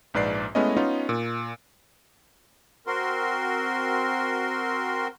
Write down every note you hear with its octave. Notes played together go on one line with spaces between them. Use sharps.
A#1 G#2 B4 D5 C7
G#3 A3 B3 C#4 E4 D#5
B3 C#4 D#4 F4
A#2
C4 F#4 A#4 C6